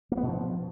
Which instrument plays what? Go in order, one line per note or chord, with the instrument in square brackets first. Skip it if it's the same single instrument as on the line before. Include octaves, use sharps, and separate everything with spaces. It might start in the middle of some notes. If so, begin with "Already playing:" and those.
[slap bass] A#3
B3
B2
F3